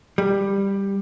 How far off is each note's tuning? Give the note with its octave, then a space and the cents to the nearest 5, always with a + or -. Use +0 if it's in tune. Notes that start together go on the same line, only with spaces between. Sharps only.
G3 +10